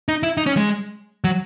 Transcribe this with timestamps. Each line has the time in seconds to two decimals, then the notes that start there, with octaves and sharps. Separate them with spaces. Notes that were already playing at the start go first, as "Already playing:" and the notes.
0.08 D#4
0.23 E4
0.37 D#4
0.46 C#4
0.57 G#3
1.24 F#3